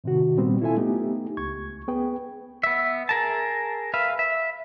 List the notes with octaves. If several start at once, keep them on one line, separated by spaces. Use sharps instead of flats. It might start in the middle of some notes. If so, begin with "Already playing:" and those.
A2 C3 D#3 F#4
A#2 G3 B3 C4
E4 F4 A4 E5 G#5
A3 B3 D#4 G4
C#2 C#6 G#6
B3 G#4 B4 G5
B3 E5
G#4 A#4 A5
B4 E5 F5
E5